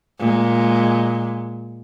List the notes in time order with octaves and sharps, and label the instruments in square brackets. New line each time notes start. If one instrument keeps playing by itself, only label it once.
[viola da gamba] A#2 G#3